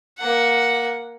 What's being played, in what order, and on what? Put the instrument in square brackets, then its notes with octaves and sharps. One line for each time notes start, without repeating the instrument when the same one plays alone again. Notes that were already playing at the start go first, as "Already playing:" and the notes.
[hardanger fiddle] A#3 F#5